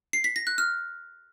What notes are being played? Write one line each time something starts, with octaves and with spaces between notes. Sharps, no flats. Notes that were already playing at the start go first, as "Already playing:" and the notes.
C7
B6
A#6
F#6
F6